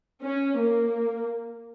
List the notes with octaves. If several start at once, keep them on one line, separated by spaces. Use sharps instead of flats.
C#4
A#3